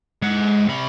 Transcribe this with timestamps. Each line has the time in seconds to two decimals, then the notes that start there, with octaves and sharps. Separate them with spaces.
0.22 G#3 F#5
0.68 C3 B5